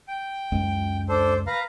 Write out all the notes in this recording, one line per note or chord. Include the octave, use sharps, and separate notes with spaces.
G5
C#2 F#2 G#3
D4 A4 C5
B4 F5 A#5